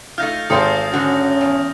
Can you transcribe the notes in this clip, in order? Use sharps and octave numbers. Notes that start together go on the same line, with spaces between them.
A3 D#4 F4 F6 G6 A#6
G#1 A#3 F4 A4 C5 C6 D#6
D3 C#4 F#4
E2